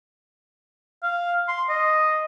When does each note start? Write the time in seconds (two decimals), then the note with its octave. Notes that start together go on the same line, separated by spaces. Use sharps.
1.03 F5
1.48 C6
1.69 D#5